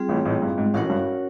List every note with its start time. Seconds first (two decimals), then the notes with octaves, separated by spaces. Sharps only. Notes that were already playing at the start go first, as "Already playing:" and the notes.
Already playing: G3 C4 F4 G#4
0.09 A1 A2
0.25 A1 A2
0.42 G2
0.58 G#2
0.74 A1 A2 C#4 F#4 A#4 C#5 F#5
0.90 G2